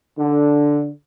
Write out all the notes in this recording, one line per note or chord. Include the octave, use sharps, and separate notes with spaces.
D3